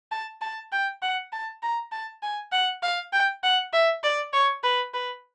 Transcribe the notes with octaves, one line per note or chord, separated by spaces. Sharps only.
A5
A5
G5
F#5
A5
A#5
A5
G#5
F#5
F5
G5
F#5
E5
D5
C#5
B4
B4